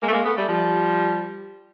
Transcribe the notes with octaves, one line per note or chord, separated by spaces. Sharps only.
G#3 A#3
A3
G#3 A#3
A3 B3
G3 A3
F3 G3